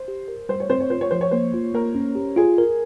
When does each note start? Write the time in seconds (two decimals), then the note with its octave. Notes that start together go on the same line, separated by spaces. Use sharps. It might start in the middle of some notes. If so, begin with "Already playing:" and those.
Already playing: C5
0.08 G4
0.28 A#4
0.49 G3 C5
0.60 C#5
0.70 C4 C5
0.80 C#5
0.90 F4 C5
1.01 C#5
1.11 F3 C5
1.21 C#5
1.31 A#3 C5
1.54 F4
1.74 A#3 A#4
1.95 C#4
2.16 G4
2.36 F4 G#4
2.58 A#4